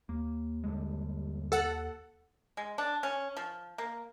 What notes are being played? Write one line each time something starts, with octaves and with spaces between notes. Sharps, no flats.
D#2 A#3
G2 D3 G#3
A4 F#5
G#3
D4
C#4
F3
A#3